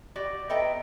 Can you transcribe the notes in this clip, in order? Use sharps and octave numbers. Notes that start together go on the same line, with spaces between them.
F#4 G4 D5
B3 A4 D#5 E5 G5 A#5